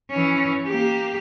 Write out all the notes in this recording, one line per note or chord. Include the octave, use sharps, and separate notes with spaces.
E3 C#4
A#3 G4